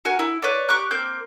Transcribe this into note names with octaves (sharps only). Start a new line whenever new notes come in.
F#4 A#4 G#5 C#6
E4
B4 C#5 D5
G4 C#6 D6 F#6
A#3 C4 D6 G6